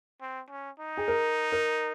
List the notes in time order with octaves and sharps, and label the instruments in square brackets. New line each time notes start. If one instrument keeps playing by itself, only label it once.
[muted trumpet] C4
C#4
D#4
[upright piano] G#4
A#4
A#4